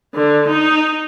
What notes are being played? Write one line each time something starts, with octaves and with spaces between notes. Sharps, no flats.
D3
D#4